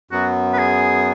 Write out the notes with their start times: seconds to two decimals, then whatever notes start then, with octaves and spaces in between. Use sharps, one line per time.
0.11 F#2 F#3 B3 F#4
0.54 B4
0.59 G#4